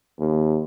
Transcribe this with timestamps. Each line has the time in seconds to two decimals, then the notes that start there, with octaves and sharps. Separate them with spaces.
0.20 D#2